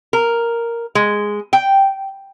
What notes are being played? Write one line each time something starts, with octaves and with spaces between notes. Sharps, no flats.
A#4
G#3
G5